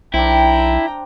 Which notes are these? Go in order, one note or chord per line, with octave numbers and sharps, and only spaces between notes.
B1 C4 D4 E4 G5 A#5